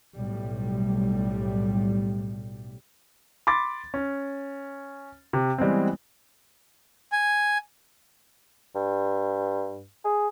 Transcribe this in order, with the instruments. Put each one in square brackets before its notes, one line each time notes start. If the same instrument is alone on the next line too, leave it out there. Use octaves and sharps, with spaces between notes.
[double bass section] B1 A2 G3
[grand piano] B5 C6 D6 A6
C#4
C3
E3 G3 G#3 B3 C4
[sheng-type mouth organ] G#5
[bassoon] G2
G#4